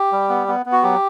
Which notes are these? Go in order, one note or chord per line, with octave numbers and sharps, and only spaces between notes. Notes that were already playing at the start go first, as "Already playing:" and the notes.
Already playing: G4
G3
B3
B3
B3
F#4
F#3 G4